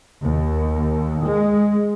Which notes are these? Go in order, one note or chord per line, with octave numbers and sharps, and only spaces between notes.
D#2
G#3